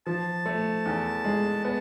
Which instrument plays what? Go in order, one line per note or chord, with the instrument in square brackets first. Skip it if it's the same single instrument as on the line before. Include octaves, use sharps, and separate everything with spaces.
[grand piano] F3 [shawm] A5
[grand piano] A3
E2
G#3
[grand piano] B3 [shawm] A5